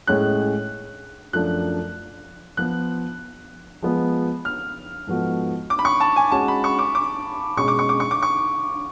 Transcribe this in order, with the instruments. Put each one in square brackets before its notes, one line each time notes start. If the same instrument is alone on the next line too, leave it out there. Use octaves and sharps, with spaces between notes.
[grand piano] A2 G#3 C#4 G#4 C#5 [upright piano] F#6
[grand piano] F#2 F3 A3 D4 [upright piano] F#6
[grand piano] F3 B3 F4 [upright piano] F#6
[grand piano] F3 G#3 B3
[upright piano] F6
[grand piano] G#2 F3 B3 F#4 A4
[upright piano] D6
B5
C#6
A5
G#5
[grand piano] G#3 C#4 F#4 [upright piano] A5
[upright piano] B5
C#6
D6
D6
[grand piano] B2 G#3 C#4 G#4 [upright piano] C#6
[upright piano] D6
C#6
D6
C#6
D6
C#6